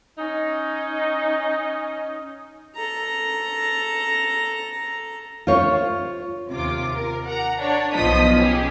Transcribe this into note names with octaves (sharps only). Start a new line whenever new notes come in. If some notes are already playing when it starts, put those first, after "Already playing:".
C#4 D#4
A4 A#5
F4 C5 C#5
D#2 C3 F4 D6
A#4
F#5 A#5
D4 C#5
B1 B2 F3 D#5 D#6 B6
C#4 G4 G#4